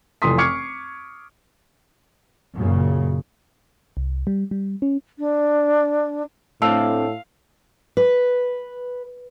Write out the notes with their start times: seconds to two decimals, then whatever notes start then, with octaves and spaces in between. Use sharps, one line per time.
0.22 F1 F2 E3 C6 D#6 B6
0.38 C#6 D6 F6 G#6 C7 C#7
2.55 F#2 A#2 C#3
3.97 C2
4.27 G3
4.51 G3
4.82 C#4
5.19 D4
6.62 A2 A3 C4 D4 F5 A5 E6
7.97 B4